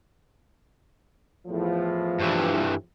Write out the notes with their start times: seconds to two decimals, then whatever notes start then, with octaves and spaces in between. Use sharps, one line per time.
1.47 E2 A2 F3
2.20 G2 E3